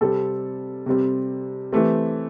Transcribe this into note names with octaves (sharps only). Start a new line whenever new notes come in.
C3 G3 C4 A4
C3 G3 C4
E3 A3 C4 G4